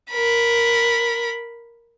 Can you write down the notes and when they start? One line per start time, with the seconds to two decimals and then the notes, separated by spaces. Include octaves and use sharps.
0.12 A#4 B5